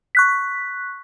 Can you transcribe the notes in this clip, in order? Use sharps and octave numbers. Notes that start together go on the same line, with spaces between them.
C#6 F#6 B6